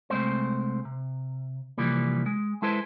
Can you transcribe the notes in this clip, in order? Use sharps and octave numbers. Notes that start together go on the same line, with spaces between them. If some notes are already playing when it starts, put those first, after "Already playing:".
C2 G#3 A3 C4 C5
C3
C3 E3 F3 G3 A#3
G#3
G#3 E4 A4 B4 C5